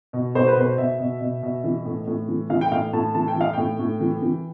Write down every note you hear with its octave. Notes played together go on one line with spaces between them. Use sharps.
B2
B2 C5
B4
B2 C5
B2 E5
B2
B2
B2
E3
A2
A2
E3
E3 F5
G5
A2 F5
A2 A5
E3 A5
G5
E3 F5
A2 G5
A2
E3
E3